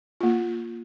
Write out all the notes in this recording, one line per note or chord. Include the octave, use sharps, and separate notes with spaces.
A#3 F4